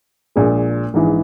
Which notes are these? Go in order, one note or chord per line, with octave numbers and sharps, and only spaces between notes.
A#1 A#2 G#3
A#1 G#2 E3 G#3